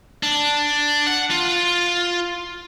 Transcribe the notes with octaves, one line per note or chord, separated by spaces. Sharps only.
D4
F#5
F4